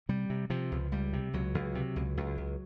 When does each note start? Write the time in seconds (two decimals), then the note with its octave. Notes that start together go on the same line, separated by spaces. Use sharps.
0.09 C3 G3
0.30 C3
0.50 C3 F3
0.71 C#2
0.92 C#2 G3
1.13 C3
1.33 C#2 F#3
1.55 C#2
1.75 C3
1.96 C#2
2.17 C#2
2.38 C#2